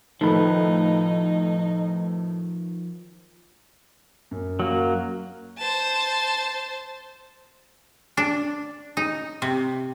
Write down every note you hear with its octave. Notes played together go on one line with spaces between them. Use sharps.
A2 D#3 F3 A3 D#4 B4
F#2
F#3 A#3
C5 A5
D4
D#4
C3